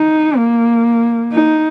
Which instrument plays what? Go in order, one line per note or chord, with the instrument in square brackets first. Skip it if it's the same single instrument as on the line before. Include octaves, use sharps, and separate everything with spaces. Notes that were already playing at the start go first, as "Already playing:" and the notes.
Already playing: [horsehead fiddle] D#4
A#3
D#4